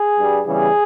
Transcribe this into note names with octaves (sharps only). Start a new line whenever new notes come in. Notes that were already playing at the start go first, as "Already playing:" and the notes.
Already playing: G#4
G2 G3
E2 C#3 E3 G3 G#4